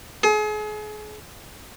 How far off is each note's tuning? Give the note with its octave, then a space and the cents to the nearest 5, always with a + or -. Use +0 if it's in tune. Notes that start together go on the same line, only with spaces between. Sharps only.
G#4 +35